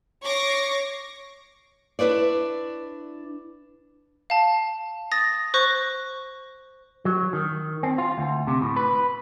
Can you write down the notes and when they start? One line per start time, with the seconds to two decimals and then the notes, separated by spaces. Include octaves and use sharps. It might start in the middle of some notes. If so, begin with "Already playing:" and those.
0.23 C#5 C#6 D6 A#6 C7
1.99 D4 E4 B4 C#5 D5
4.30 F5 A5
5.12 D#6 A6 A#6
5.54 C5 C#6 F#6 A#6
7.05 F#3
7.33 D#3
7.83 C4
7.98 F4
8.18 D2
8.47 C3
8.61 A2
8.76 B4